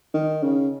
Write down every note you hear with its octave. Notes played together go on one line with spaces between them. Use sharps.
D#3
C#3